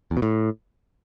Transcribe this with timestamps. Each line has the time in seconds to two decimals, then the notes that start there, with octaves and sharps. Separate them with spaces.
0.11 E2
0.17 B2
0.22 A2